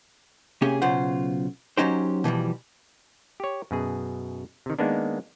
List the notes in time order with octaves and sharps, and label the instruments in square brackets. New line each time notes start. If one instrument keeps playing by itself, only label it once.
[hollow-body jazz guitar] C3 A#3 C#4 G4 G#4
B1 C#3 F4 C5 F#5
F#3 G3 C#4 D#4 G4 C5
B2 E3 F3 G3
[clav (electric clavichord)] G4 C#5
F#2 B2 G#4
C3 D#3
D#3 G#3 A#3 B3 D4